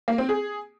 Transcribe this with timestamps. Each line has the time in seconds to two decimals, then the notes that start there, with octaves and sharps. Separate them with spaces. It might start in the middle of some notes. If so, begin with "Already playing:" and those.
0.08 A#3
0.18 C4
0.29 G#4